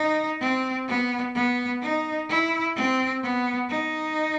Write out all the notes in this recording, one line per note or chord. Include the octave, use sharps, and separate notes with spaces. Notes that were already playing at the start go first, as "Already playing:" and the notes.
Already playing: D#4
C4
B3
B3
D#4
E4
C4
B3
D#4